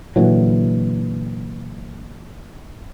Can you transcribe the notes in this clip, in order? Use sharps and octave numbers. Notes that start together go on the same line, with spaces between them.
A#2 D3 E3 F#3